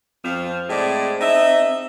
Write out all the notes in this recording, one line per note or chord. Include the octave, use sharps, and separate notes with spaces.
F2 F3 C4
A2 G#3 D5
D#4 E5